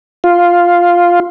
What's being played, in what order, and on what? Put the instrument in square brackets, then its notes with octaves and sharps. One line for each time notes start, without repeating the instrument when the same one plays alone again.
[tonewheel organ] F4